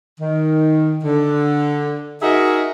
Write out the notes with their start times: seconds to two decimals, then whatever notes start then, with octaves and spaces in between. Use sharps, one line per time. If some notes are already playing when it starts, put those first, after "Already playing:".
0.20 D#3
1.04 D3
2.22 D#4 F#4 G#4 A#4 D#5 E5